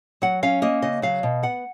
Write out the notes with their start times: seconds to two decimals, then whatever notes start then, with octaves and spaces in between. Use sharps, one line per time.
0.22 F#3 F#5
0.43 C#4 F5
0.62 A#3 D#5
0.82 C#3 D#5
1.02 F#3 F5
1.23 B2
1.43 B3 F#5